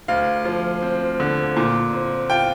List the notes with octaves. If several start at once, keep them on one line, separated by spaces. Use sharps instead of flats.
D2 F5
F3
C4
D3
A#2
C4
F4 G5